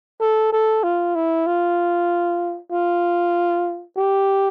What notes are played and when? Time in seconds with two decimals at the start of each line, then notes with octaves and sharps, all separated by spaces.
0.21 A4
0.52 A4
0.84 F4
1.15 E4
1.46 F4
2.72 F4
3.96 G4